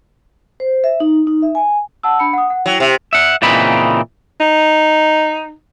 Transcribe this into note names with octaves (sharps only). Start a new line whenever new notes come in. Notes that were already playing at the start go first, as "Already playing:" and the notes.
C5
E5
D#4
D#4
E5
G#5
F#5 A5 E6
D4 B5 C#7
F#5 D#6
F#5
F#3 E4 G5
C3
E5 F#5
A#2 C#3 E3 C4 D#4 B5
D#4